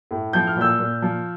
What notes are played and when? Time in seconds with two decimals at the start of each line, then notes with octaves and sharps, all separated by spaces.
0.11 A2
0.33 F3 G6
0.47 F6
0.57 A#2 E6 G6
0.79 A#2
1.02 F3